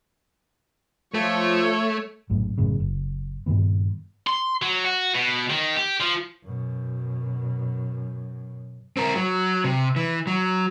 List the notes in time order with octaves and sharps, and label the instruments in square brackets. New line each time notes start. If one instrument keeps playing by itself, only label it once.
[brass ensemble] F3 [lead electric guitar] A3 [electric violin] C#5
[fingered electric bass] A#1 F#2 A2
A1 F#2 A2 C#3
F#1
G2 A#2 D#3 B3
[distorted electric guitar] C6
F#3
F#4
B2
D#3
G4
F3
[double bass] F#2 B2
[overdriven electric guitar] C4 A#4
F#3
C3
E3
F#3